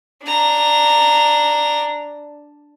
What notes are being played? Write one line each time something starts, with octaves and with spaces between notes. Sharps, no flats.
D4 A#5